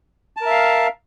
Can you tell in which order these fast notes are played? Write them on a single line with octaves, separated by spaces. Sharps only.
A5 A#4 E5 F5